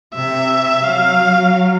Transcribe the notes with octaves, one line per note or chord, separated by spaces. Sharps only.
C3 E5
F#3 F5